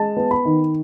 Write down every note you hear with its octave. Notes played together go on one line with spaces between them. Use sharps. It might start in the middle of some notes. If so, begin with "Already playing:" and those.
Already playing: G#3 A5
B3
B5
D#3